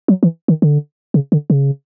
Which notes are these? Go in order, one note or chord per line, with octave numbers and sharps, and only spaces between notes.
F#3
E3
D#3
D3
C#3
D3
C#3